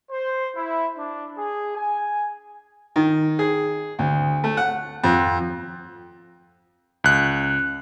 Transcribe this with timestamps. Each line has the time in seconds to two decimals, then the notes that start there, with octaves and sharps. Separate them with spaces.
0.11 C5
0.55 E4
0.97 D4
1.38 G#4
1.76 G#5
2.96 D#3
3.39 G#4
3.99 D2
4.44 A3
4.57 F#5
5.04 F2
7.04 C#2 F#6